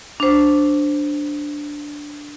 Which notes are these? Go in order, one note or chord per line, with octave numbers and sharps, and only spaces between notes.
D4 C5